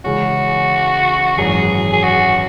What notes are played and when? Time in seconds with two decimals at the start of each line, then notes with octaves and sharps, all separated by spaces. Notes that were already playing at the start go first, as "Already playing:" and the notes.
0.04 C#3 E3 G#3 C#4 F#4
1.37 G#1 F#2 E3 G#4
1.92 G#4
2.02 F#4